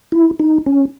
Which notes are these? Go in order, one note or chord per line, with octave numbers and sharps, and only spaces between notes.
E4
D#4
C#4